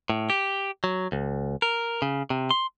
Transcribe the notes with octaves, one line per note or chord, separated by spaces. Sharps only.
A2
G4
F#3
C#2
A#4
C#3
C3
C6